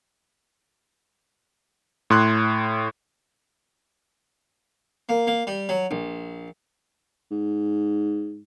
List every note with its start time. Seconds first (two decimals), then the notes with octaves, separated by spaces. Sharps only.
2.10 A2 C6 F#6
5.09 A#3
5.27 A#3
5.47 G3
5.69 F#3
5.91 A#1
7.31 G#2